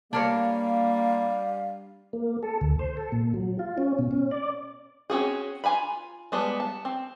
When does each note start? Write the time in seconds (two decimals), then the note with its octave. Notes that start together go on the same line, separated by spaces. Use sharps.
0.13 G3 A#3 D4 A#4 C#5 F5
2.13 A#3
2.43 A4
2.61 D2
2.79 C5
2.97 A4
3.12 A#2
3.34 F#3
3.59 F4
3.78 C#4
3.99 B2
4.11 C#4
4.31 D5
5.10 C4 C#4 F#4 G#4
5.64 F4 G#5 A#5 B5
6.32 G3 G#3 B3 A5
6.60 A5
6.85 C4